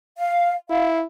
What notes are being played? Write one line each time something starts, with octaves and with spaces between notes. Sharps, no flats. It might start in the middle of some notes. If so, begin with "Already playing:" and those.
F5
E4 F5